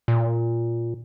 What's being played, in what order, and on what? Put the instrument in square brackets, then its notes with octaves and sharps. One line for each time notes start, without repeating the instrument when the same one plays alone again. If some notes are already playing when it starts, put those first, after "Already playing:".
[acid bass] A#2